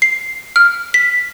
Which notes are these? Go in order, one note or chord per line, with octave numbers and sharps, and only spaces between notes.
C7
F6
B6